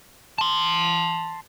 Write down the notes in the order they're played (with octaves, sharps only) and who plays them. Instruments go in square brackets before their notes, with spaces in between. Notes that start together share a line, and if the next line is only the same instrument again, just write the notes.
[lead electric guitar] A5 C6